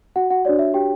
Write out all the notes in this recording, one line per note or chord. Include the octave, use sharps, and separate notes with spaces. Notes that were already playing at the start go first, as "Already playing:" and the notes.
F#4 F#5
F#4 F#5
D4 F#4 C#5 D5
E5
G4 G5